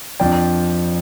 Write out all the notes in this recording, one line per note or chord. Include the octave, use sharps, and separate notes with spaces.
F2 F3 D4 G5